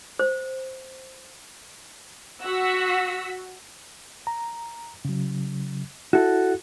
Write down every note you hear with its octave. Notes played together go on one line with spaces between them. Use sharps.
C5
F#4 F#5 E6 B6
A#5
C#3 F#3
E4 F#4 A4